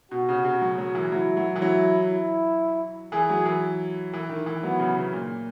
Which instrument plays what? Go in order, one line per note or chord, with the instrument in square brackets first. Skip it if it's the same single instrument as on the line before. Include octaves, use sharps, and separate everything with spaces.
[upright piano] B2 [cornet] F#4
[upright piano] C#3
C#3
F#3
F#3
E3
[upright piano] F#3 [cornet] E4
[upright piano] F#3
E3
[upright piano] F#3 [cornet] E4
[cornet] E4
[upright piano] E3 [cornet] G#4
[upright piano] F#3
E3
E3
D#3
E3
[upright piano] F#3 [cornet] B3
[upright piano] C#3
C#3
A#2